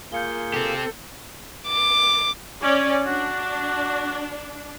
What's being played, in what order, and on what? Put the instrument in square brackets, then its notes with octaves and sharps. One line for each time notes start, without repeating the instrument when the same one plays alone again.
[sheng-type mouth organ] A#3 F4 G#4 [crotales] G6 C#7 G7
[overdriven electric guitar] C4 G4 [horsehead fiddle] A4
[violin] D6
[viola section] C#4 D5 [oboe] C#5
[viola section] D4 [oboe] F#4